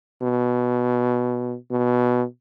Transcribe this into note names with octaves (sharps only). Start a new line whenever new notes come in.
B2
B2